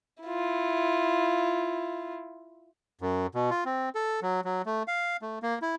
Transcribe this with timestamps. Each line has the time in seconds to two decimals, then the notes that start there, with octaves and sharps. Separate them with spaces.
0.23 E4 F4
3.01 F#2
3.35 B2
3.51 F4
3.65 C4
3.95 A4
4.22 F#3
4.45 F#3
4.66 A3
4.88 F5
5.22 A3
5.43 A#3
5.62 E4